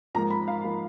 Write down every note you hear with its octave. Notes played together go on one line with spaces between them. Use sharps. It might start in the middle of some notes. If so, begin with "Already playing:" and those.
G#2 F3 A#3 A#5
B5
F5
F3 A#3